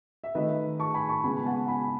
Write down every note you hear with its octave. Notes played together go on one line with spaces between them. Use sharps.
E5
D#3 A3 B4 D#5
A5 C#6
G#5 B5
A5 C#6
C#3 G#3 B3 G#5 B5
G#5
F#5 A5
G#5 B5